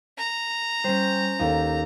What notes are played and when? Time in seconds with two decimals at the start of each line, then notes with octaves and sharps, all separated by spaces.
0.18 A#5
0.84 G3 C#4 C5
1.39 D#2 D#4 A4 F5